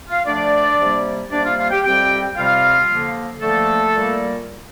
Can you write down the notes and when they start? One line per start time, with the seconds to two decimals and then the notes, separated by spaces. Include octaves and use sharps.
0.09 F4 F5
0.26 D3 F3 A3 D4 D5
0.79 C3 G3 A#3
1.31 C3 G3 A#3 D4 D5
1.45 F4 F5
1.58 F4 F5
1.71 G4 G5
1.84 F2 C3 G3 C4 G4 G5
2.36 F2 C3 G3 C4 F4 F5
2.89 D3 F3 A#3
3.42 D3 F3 A3 A#3 A4
3.95 A#2 G3 A#3